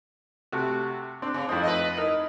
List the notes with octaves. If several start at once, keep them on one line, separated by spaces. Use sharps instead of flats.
C3 A3 F#4
C4 D4
C#3
F2 A3 C4 D#4 E4
B4 D#5
D#4 E4 A#4